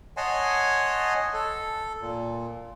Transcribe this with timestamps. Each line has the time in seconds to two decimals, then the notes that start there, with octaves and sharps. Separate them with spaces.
0.17 C#5 D#5 F#5 G#5 A5 C6
1.34 A4
2.01 A#2